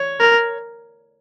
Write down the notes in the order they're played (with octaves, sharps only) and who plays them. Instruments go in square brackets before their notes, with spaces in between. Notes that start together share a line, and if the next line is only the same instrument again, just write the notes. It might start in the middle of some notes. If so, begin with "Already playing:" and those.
Already playing: [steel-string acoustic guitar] C#5
[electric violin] A#4